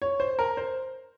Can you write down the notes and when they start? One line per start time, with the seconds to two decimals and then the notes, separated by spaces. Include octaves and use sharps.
0.02 C#5
0.20 C5
0.39 A#4
0.57 C5